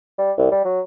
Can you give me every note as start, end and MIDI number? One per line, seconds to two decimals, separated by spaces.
0.18 0.32 55
0.38 0.48 36
0.51 0.64 55
0.65 0.80 54